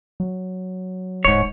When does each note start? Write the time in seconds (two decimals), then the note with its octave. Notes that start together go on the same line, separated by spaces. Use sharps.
0.20 F#3
1.25 D1 G#2 C#5